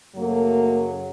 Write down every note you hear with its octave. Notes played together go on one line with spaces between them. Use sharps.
F#2 C#3 F#3 A3 A#3